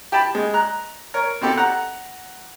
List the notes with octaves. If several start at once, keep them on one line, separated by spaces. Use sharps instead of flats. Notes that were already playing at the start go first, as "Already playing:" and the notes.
G4 G5 A5 B5
G#3
A#5 F#6
A#4 C#5
B2 C4 G4 A4
F#5 A#5